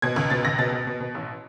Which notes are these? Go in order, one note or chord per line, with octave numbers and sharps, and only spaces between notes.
B2 G#6
C#2
B2 A6
C#2 A#6
B2 A6
B2
B2
B2
A1